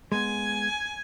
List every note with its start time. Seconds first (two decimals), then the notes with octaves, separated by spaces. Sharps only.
0.12 G#3 B3 G#5